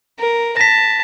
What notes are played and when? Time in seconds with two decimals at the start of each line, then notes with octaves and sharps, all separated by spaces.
0.18 A#4
0.57 A5 A#6 B6